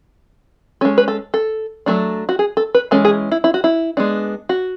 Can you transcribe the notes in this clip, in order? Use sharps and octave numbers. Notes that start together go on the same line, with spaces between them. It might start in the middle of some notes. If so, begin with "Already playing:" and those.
G#3 C#4 A4
B4
A4
A4
F#3 A3 D4
F#4
G#4
A4
B4
E3 G#3 C#4 A4
G#4
E4
E4
F#4
E4
G#3 B3 D4
F#4